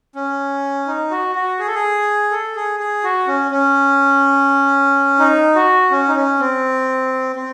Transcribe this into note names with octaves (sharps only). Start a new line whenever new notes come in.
C#4
D#4
F#4
F#4
G#4
A4
G#4
A4
G#4
G#4
F#4
C#4
C#4
D#4
F#4
C#4
D#4
C#4
C4
C4